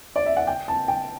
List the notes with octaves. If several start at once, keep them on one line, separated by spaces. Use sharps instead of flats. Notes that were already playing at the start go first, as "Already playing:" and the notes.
D5
E5
F#5
G5
A5
G5